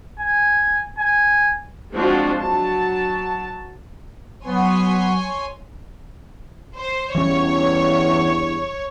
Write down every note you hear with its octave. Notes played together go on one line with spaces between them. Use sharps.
G#5
G#5
F3 G#3 C4 D4 F4 F#4
F#3 A5
F#3 B3 C#5 G#5 C6
C5
E2 G2 E3 G3 C#4 C#5